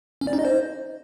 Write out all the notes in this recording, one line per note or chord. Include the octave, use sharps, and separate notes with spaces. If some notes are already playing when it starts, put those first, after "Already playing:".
C#4
D5
D#4
D#5
C5